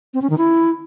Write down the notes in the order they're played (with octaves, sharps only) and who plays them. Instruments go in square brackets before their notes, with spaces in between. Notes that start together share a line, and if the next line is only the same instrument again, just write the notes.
[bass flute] C4
C#4
D#3
E4